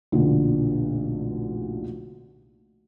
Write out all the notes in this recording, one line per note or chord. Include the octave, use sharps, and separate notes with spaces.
F1 B1 A#2 D3